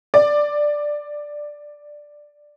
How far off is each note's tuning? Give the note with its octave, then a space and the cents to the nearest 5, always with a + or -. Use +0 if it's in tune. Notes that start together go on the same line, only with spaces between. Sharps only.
D5 +5